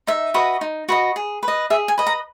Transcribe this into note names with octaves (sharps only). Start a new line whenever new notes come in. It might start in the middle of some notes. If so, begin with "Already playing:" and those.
D#4 E5
F#4 B4 D#5
D#4
F#4 B4 D#5
G#4
B4
D#5
G#4 E5
G#5
B4 D#5
A#5